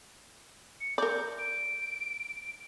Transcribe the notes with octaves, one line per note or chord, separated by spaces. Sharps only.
C#7
A#4 D5 G6
D7